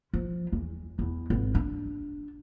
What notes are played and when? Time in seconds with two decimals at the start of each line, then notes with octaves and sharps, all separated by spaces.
0.14 F3
0.53 E2
0.99 E2
1.30 G#1
1.55 D4